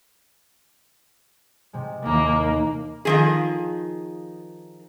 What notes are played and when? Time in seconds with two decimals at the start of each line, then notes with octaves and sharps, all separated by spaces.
1.73 C3 G#3
2.06 D#2 E3 A#3
3.05 D#3 F3 G#4